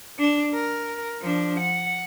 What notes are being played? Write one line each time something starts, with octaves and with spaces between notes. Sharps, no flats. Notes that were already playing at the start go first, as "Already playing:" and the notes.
D4
A#4
F3 D4
F#5